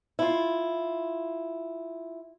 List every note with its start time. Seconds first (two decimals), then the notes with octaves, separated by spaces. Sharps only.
0.19 E4 F4